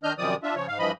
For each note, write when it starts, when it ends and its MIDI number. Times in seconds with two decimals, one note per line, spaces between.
0.03 0.13 51
0.03 0.13 62
0.03 0.13 75
0.03 0.13 89
0.03 0.13 91
0.18 0.35 42
0.18 0.35 48
0.18 0.35 51
0.18 0.35 53
0.18 0.35 74
0.18 0.35 87
0.43 0.55 62
0.43 0.55 65
0.43 0.55 76
0.55 0.67 49
0.55 0.67 53
0.55 0.67 73
0.68 0.79 44
0.68 0.79 77
0.79 0.92 43
0.79 0.92 52
0.79 0.92 53
0.79 0.92 75
0.79 0.92 83